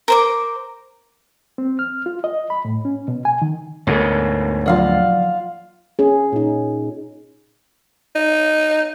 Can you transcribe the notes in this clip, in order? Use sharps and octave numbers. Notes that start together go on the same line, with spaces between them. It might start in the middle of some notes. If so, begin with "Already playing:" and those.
A#4 C5 D6
C4
F6
F4
D#5
B5
A2
C#4
B2
G#5
D#3
D2 G#2 B2 A4 A#4 C#5
F3 F#3 F4 D5 F5 F#5
C#4 G#4
A#2 D#4
D#4